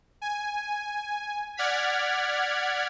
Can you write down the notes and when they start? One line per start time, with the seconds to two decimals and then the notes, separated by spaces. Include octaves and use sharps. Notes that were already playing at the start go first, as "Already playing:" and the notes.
0.22 G#5
1.57 D5 F#5 F6 G#6 B6